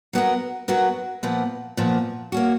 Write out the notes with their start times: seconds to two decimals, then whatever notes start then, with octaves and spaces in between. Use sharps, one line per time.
0.13 F#3 B3 F#4 A#4
0.68 F#3 B3 F#4 A#4
1.23 A#2 F3 B3
1.77 A#2 F3 B3
2.32 A#3 C#4 F#4